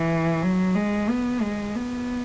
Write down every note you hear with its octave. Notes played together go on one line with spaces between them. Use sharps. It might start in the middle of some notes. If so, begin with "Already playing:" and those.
Already playing: E3
F#3
G#3
B3
G#3
B3